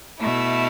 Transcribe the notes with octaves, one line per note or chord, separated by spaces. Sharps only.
B2 A3 E4